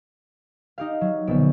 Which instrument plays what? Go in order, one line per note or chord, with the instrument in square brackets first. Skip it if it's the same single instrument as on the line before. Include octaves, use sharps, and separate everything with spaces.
[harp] D#4 G4 F5
F#3
[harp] A#1 B2 [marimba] D3 B3